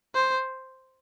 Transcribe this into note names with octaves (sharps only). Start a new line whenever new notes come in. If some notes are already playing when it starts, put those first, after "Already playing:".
C5